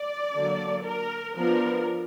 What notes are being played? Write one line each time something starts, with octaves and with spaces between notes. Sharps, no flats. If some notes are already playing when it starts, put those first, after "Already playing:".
Already playing: D5
D3 F#3 A#3
A#4
F3 B3 D4 A#4